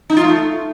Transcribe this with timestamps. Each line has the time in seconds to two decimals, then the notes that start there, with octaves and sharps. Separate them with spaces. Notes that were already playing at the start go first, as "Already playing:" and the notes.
0.10 D#4
0.17 F4
0.24 A3